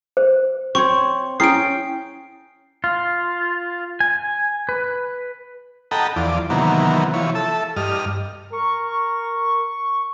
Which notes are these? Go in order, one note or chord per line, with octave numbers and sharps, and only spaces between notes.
C5
C4 C#5 C#6
C#4 E4 G5 D#6 C7 D7
F4
G#5
B4
A4 D#5 F#5 G5 A#5 B5
E2 F3 D5
C3 D#3 E3 F#3 A#3 B3
E3 F3 C#5
A4 E5
G2 D#5 F6
A#4 C#6